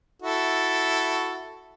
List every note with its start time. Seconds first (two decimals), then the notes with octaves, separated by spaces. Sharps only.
0.22 E4 F#4 A4